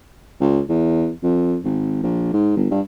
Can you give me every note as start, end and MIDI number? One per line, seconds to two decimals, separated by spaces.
0.40 0.61 37
0.69 1.10 40
1.23 1.57 41
1.64 2.01 32
2.03 2.32 34
2.33 2.52 44
2.57 2.69 31
2.71 2.81 43